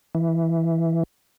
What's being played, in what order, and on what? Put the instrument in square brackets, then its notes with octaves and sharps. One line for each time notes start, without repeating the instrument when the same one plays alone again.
[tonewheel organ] E3